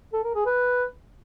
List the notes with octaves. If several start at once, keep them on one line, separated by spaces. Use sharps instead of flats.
A4
A#4
G#4
B4